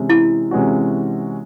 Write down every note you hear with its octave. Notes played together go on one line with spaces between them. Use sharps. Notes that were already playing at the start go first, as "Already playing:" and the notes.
Already playing: C3 E3 G#3 C#4
E4
C3 E3 G#3 C#4 F#4